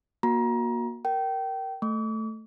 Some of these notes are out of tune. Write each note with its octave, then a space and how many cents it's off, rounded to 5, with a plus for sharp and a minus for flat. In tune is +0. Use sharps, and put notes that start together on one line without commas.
A#3 +25 F#4 -25 A#5 +25
A#4 +0 G5 -25
A3 +0 D6 -45